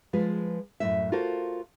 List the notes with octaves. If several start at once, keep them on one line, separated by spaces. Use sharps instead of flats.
F3 G#3 F4 B4
F#2 A2 E5
F4 F#4 A4 A#4 C5 F5